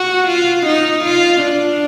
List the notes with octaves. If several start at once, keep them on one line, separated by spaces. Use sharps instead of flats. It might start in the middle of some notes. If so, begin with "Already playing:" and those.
Already playing: F#4
F4
D#4
F4
D4